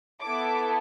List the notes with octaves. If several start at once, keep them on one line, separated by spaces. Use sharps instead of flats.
B3 E4 A4 D6